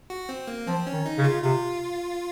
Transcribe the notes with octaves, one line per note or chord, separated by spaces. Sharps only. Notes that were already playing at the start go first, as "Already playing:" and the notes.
F#4
C4
A#3
F3 C4
C#4
D#3
D#4
C#3
F4
C3 F4